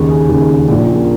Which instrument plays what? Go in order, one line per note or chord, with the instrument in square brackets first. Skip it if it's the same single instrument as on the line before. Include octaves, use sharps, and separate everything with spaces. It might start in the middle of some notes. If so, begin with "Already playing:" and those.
Already playing: [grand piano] D#2 C#3
G#4
D#2 C#3
A#1 A#2
A#4